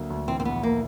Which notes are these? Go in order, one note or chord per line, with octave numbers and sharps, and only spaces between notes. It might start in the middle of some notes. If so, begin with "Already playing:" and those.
Already playing: D2 D3 F#3 A#3
D2
E3 C4
C4
A#1 B3
A#3